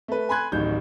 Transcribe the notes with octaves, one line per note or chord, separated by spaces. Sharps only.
A3 B4
G#5 B5 C6 F#6 G#6
D1 A1 D#3 G6